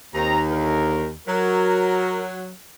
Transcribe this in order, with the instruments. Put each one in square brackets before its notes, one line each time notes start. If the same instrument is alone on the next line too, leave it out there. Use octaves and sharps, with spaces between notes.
[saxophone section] D#2 [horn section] C4 A#5
[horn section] D3 A#4
[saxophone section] F#3 [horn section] A#4